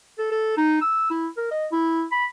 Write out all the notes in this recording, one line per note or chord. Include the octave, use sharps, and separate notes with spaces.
A4
A4
D#4
E6
E4
A#4
D#5
E4
B5